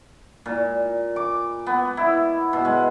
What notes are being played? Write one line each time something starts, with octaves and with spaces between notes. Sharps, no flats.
A#2
D6
B3
E4
B2
G#3